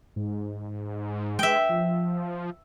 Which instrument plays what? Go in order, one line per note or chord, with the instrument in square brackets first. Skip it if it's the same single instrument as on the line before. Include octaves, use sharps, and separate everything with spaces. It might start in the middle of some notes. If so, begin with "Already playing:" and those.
[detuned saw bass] G#2
[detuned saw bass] G#3 [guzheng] E5 G5
[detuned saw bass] F3